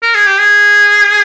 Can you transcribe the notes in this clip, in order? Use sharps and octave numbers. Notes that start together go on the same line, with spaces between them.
A#4
G#4
G4
G#4